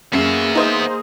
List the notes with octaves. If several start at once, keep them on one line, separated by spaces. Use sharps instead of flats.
F#2 A#3 B3 G#4 E5 C7
D#4 C5 D#6